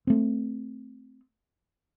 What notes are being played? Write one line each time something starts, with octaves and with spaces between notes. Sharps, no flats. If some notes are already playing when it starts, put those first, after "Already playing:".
A3 C4